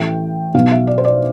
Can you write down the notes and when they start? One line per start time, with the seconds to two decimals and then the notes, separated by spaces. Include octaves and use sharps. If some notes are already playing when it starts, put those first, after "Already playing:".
Already playing: A1 A2 E3 A3 G5
0.54 B1 B2 B3 F5
0.71 E5
0.87 D5
0.98 C5
1.05 D5